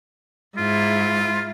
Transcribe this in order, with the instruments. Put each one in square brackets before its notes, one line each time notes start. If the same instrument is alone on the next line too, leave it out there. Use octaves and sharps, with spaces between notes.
[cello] G#2 E4 [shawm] F4